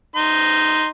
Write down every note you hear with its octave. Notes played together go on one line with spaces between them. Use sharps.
D#4 C6